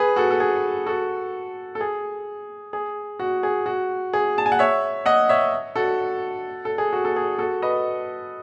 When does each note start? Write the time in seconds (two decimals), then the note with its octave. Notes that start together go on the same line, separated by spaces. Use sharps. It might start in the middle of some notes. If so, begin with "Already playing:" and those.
Already playing: G#4 B4
0.16 F#4 A4
0.30 A4
0.40 G#4
0.86 F#4 A4
1.75 A4
1.81 G#4
2.73 G#4
3.19 F#4
3.43 G#4
3.66 F#4
4.13 G#4
4.38 A5
4.46 G#5
4.52 F#5
4.59 C#5 E5
5.06 D#5 F#5
5.29 C#5 E5
5.76 F#4 A4
6.65 A4
6.78 G#4
6.93 F#4
7.05 A4
7.16 G#4
7.39 F#4 A4
7.62 B4 D#5